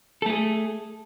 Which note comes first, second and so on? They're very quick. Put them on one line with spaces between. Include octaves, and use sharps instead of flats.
A4 A3 G#4